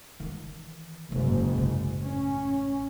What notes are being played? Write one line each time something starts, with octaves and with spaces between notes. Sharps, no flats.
D#3 E3
F#1 G#2 C3
A1 A3
C#4